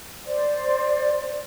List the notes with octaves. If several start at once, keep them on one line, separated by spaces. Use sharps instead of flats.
C5 D5